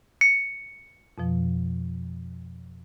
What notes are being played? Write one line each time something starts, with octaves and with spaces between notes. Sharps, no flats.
C#7
F2 B2 F3